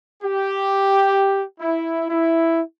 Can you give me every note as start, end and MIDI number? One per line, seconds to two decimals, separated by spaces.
0.22 1.41 67
1.60 2.07 64
2.10 2.61 64